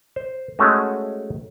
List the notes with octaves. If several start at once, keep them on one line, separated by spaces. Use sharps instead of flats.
C5
G#3 A3 C#4 F#4 C#5 D#5